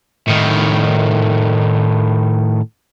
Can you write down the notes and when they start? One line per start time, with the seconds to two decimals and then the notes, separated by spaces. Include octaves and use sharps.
0.28 A2 D#3